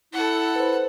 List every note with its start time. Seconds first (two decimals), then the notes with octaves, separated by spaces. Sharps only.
0.13 E4 A4 F#5
0.56 B4 C5